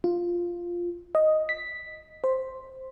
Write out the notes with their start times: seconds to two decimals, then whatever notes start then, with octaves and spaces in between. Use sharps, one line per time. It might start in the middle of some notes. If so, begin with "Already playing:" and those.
0.04 F4
1.15 D#5
1.49 B6
2.24 C5